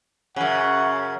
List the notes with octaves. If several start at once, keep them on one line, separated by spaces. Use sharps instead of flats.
F#2 C#3 F#5